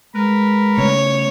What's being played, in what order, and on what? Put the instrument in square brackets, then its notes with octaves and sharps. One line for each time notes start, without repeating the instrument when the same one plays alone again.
[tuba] G#3 [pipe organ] A#4 B4
[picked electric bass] C#3 A3 [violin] C#5